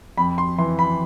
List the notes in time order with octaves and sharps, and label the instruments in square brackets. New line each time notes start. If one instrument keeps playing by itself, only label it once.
[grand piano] F2 B5
C6
E3 C6
B5